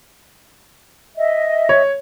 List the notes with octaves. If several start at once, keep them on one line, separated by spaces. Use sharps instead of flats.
D#5 E5
C#5